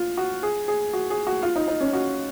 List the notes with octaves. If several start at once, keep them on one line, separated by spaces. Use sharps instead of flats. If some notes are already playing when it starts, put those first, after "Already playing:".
Already playing: F4
F#4
G#4
G#4
F#4
G#4
F#4
F4
D#4
D#4
C#4
F#4